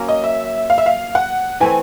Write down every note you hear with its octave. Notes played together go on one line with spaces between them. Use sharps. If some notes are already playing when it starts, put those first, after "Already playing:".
Already playing: F#3 A#3 C#4
D#5
E5
F5
E5
F5
F#5
E3 A3 C4 G#5